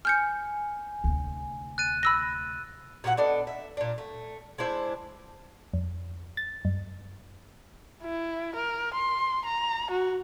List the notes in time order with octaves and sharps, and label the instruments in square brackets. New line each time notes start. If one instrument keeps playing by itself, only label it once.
[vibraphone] G#5 [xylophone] F6 G6 C#7
[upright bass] D2 C3
[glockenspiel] F#6 A6 D#7
[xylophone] B5 E6 A#6
[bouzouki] A#2 F#3 G4 F#5
B3 D4 A4 D#5
E5
A#2 D4
A3
G#3 D4 E4 C5
[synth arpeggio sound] F2
A6
F#2
[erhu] E4
A#4
C6
A#5
F#4